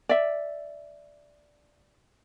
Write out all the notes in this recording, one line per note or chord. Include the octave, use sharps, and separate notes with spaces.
D5 E5